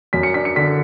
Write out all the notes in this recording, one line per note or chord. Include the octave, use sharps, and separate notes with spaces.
F#2 B6
C#7
D4 B6
C#7
D3 B6